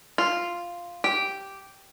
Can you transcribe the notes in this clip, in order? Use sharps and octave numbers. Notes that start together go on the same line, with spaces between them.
F4
G4